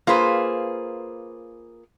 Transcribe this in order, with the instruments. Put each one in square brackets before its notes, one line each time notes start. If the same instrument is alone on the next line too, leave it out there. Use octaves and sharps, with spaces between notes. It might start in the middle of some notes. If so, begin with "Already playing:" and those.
[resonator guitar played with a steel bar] A#3 F4 G#4 B4 C5